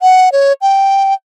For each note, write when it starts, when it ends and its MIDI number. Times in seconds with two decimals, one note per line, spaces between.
0.01 0.32 78
0.32 0.53 73
0.62 1.14 79